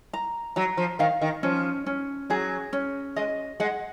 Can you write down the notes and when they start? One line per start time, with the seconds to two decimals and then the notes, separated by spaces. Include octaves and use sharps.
0.13 A#5
0.56 F#3 A#5
0.77 F3
0.99 D#3 F5
1.21 D#3
1.43 F3 C#4
1.86 C#4
2.30 F#3 G#4
2.73 C#4
3.16 G#3 D#5
3.60 G#3 F#5